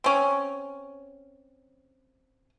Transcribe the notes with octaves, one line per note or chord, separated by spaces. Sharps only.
C4 C#4